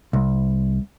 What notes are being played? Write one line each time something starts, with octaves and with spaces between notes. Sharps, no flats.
C2